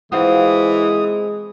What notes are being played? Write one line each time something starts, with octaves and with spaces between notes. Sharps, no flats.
E3 G#3 C4 F4 F#4 D#6